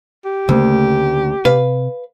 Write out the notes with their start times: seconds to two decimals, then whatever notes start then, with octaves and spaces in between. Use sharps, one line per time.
0.25 G4
0.49 D2 C#3 A3 A#3
1.45 C3 B4 F5